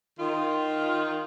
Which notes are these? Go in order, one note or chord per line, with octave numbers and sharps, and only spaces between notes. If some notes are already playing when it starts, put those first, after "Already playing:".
D#3 F4